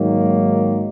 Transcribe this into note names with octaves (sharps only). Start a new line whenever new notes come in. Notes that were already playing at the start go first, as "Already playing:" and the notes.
Already playing: G#2 D#3 F#3 A#3